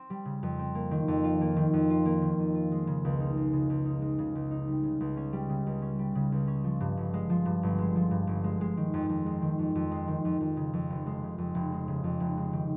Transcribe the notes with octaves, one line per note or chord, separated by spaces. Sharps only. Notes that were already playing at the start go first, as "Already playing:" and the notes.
Already playing: C4
G3
C#3
F2
C4
A#3
D#3
F2
F4
A#3
D#3
F2
F4
A#3
D#3
F2
F4
G#3
C#3
C#2
D#4
G#3
C#3
C#2
D#4
G#3
C#3
C#2
D#4
G3
C#3
C#2
C#4
G3
C#3
C#2
C#4
G3
C#3
C#2
C#4
F3
G2
G1
G#3
F3
G2
G1
G#3
F3
G2
G1
G#3
G#3
D#3
F2
F2
G#3
D#3
F2
F2
G#3
D#3
F2
F2
C#3
F2
F1
G#3
C#3
F2
F1
G#3
C#3
F2
F1
G#3
D#3